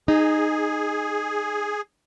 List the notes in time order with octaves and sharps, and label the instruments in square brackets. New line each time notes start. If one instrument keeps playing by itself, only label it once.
[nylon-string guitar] D#4 [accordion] G#4